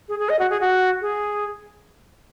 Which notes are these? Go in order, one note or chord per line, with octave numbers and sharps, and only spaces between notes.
G#4
G#4
D#5
F#4
G#4
F#4
G#4